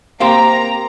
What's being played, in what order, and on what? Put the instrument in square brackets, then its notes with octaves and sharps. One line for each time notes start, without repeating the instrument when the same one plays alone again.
[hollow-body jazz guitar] A#3 C4 G4 [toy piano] F5 C6 D6 [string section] A#5